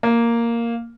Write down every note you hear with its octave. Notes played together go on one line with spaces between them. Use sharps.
A#3